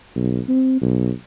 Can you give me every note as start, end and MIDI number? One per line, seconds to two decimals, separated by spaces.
0.15 0.40 35
0.48 0.78 60
0.81 1.10 35